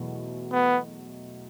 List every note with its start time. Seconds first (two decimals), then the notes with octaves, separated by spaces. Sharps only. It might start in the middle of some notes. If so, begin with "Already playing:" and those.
Already playing: E2 B2 F#3 A3
0.52 B3